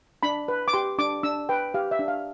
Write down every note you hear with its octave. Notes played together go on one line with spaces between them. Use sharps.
D4 B5
B4
D6
G4 C6
D4 D6
D4 E6
B4 G5
G4 F5
E5
D4
F5